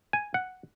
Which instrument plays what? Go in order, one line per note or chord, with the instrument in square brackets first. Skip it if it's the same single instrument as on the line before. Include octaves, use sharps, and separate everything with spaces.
[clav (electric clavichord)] G#5
F#5